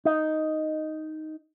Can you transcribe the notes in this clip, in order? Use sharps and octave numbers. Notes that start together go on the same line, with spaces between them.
D#4